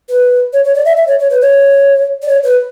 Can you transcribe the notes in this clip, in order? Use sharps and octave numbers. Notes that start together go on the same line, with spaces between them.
B4
C#5
C#5
D5
E5
E5
C#5
C#5
B4
C#5
D5
C#5
B4